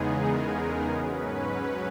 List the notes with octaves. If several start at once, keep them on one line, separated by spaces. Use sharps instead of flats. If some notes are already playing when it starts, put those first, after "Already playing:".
Already playing: E2 C#3 G#3 B3 D#4 G#4
A#4
G#2 F#3 C#4 B4